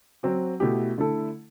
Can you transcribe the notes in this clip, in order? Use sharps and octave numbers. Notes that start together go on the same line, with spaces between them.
F#3 C4 F#4
B2 A3 E4 G4
D3 A3 E4 A4